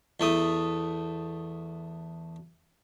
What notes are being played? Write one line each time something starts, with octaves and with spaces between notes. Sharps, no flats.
E2 A3 D#6